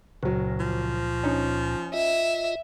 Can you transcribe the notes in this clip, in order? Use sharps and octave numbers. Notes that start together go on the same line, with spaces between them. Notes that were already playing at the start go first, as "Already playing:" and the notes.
F#1 C#2 A#2 F#3
F3
C#4 D#4
F4 D#5 E5